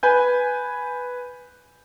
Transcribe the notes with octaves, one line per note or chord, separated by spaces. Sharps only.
B4 G#5 G6